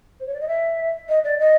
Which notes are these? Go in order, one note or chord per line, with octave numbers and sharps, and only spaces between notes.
C5
C#5
D5
D#5
E5
D#5
D5
D#5